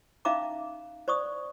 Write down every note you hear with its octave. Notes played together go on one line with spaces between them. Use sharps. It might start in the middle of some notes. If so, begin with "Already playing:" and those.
C#4 D#4 E5 F5 A#5 D6
C5 D5 C#6 D#6